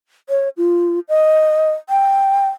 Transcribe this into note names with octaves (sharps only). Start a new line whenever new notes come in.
C#5
F4
D#5
G5